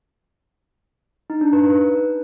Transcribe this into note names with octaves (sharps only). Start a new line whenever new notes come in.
D#4
D4
B4